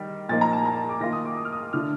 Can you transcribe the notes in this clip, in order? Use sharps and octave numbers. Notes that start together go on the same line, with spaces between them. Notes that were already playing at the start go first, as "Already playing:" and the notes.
Already playing: D#3 G3
A#2 F3 A#3 D#4 A6
A#5
A5
A#5
A#5
D6
D#3 A#3 F4 A#6
D#6
D6
D#6
F6
D#6
D3 A3 D4 F6